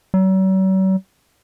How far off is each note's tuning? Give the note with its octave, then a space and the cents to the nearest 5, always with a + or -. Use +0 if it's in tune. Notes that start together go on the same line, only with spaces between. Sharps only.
F#3 +45